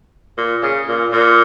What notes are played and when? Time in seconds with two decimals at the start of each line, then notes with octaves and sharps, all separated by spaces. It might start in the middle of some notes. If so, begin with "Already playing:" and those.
0.38 A#2
0.63 C#3
0.88 A#2
1.12 A#2